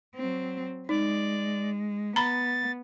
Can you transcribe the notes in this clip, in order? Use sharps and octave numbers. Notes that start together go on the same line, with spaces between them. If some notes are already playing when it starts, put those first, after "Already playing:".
F#3 C4
G#3 D#4 D5
B3 A#5 B5 A6